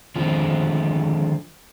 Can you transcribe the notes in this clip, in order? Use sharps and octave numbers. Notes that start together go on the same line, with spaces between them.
D3 D#3 F3 G#3 C4 F4